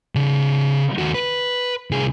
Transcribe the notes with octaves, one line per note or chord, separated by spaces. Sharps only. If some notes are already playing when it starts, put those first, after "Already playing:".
C#3 D5
D#2 F#4
B4
C2 G#4